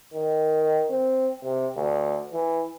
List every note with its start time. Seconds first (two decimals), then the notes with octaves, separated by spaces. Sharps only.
0.14 D#3
0.91 C4
1.44 C3
1.76 D2
2.33 E3